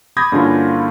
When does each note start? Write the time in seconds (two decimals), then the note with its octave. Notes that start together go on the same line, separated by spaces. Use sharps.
0.17 B5 D6 D#6 G6 G#6 A#6
0.32 G2 D3 A#3 C#4 E4 F4